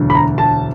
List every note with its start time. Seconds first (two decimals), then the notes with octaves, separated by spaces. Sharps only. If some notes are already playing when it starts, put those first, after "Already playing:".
Already playing: E1 D2 D3 F#3
0.10 B5
0.15 A#5
0.38 A5